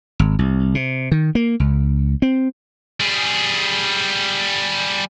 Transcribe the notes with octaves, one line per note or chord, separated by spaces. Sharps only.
G#1
C2
C3
D#3
A#3
C#2
C4
G3 G#4